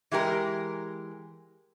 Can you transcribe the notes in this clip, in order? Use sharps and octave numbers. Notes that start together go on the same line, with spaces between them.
E3 G#3 G4 A#4